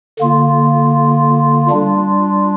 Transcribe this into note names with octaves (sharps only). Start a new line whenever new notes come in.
D3 A#3 F4
G3 D4 F4